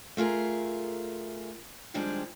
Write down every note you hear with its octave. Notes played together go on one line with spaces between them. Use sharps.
A3 F4 G#4 A#4
D#3 F3 G3 G#3 C4 D4